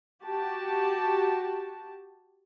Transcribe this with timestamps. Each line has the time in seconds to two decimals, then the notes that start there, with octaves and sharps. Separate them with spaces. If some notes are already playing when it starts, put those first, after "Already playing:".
0.22 F#4 G4 A5